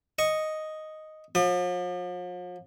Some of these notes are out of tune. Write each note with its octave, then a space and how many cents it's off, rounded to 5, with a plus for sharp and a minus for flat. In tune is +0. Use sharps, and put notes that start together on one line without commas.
D#5 +0 C#6 +0
F3 +45 D#6 -45